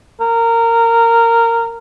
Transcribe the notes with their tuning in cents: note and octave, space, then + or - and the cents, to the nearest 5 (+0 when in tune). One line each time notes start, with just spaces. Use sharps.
A#4 -15